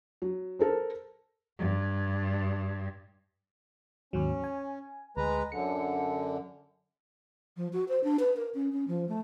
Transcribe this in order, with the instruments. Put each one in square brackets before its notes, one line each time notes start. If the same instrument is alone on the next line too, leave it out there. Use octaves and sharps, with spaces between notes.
[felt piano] F#3
A4 A#4 C5
[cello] G2
[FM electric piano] D#2 G#2 F#3 [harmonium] C#4
[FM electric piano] G#5
[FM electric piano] D2 [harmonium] G#3 B4 A#5
[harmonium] F#2 D3 [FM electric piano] C#7
[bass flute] F3
F#4
C5
D4
B4
A#4
C#4
C#4
F3
A3